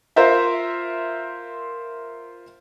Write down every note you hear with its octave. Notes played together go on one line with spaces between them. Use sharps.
F4 A#4 C5 E5